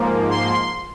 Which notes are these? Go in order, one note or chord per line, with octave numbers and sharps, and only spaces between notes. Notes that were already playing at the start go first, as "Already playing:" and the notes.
Already playing: G#2 F3 A#3
C6